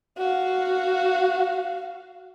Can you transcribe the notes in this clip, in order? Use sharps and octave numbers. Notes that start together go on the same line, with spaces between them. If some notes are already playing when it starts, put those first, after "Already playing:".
F#4 F5